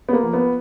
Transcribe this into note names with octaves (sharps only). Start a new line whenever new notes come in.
B3
A#3
F3
B3